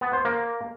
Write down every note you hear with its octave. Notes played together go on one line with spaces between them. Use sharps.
B3
C5
A#3